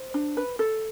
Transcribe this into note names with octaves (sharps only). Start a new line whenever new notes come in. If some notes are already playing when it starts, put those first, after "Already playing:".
Already playing: C5
D4
B4
A4